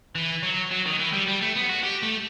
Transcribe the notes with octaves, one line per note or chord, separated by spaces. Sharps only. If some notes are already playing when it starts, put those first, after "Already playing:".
E3
F#3
F#3
D#3
E3
G3
G3
A3
B3
F#4
G4
A3